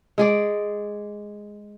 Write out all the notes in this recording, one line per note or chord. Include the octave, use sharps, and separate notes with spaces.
G#3 G#4 D5